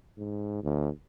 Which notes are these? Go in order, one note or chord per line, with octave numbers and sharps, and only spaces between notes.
G#2
D2